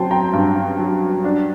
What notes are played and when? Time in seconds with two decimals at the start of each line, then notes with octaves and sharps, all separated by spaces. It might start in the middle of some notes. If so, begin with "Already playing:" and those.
Already playing: F#3 C4 G5 A5 C6
0.11 G5 A#5
0.33 G2
0.79 F#3
1.24 D4